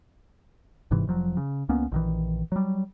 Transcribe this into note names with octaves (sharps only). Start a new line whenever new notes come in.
G1 G#2 C3 E3
F1 F3 F#3
C#3
C#2 A#3 B3 C#4
A#1 D#3 E3
F#3 G3